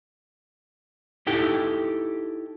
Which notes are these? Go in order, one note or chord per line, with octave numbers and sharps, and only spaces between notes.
D#4 E4 G4 A4 G5